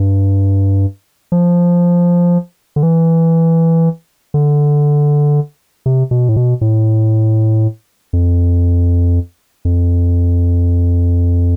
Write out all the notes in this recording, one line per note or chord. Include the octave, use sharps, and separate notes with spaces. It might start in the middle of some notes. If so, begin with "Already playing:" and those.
Already playing: G2
F3
D3
E3
D3
C3
B2
A2
B2
A2
F2
F2